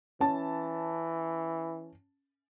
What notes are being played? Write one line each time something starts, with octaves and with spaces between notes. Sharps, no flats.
E3 C#4 A5